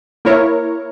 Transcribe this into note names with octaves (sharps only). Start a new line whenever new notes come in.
A#3 E4 A#4 C#5